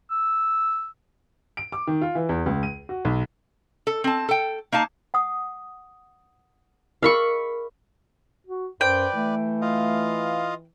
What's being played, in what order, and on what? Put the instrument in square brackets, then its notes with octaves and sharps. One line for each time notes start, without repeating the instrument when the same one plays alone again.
[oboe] E6
[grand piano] D7
D6
D#3
F4
E3
E2
C#2
D#7
F#4
B1
[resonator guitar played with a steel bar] A4
C4 A5
A4 G5
A#3 D#4 F5 A5
[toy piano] F#5 D#6
[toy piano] G#4 A#4 D#5 [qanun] F5 B5 C#6
[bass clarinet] F#4
[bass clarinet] F#2 [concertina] B4 D5 [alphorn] C5 [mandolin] G5
[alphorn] E3 [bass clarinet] A3
[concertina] F4 D#5 F5